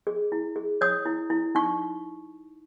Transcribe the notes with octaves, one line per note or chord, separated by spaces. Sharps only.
G#4
E4
G#4
C#5 D#6
E4
E4
D#4 C#6